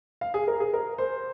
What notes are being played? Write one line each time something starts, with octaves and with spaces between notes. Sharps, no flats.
F5
G#4
A#4
G#4
A#4
C5